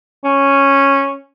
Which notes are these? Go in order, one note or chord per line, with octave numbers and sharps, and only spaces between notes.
C#4